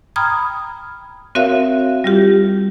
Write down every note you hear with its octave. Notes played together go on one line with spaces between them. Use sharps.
G5 A#5 B5 D#6 F6 G#6
C4 F#4 A#4 C#5 E5 F5
G3 F4 G4